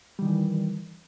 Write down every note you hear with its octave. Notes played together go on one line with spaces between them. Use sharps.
D#3 E3 G3